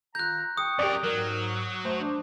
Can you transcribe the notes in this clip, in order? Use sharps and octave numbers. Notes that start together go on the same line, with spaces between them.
D#3 F4 A#5 F#6 G6
G5 C#6 D#6
F#2 G4 A#4 D5
G#2 F#3 A#4
A3 C5
D4